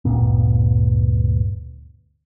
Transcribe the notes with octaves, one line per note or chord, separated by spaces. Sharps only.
G1 D2 A#2 B3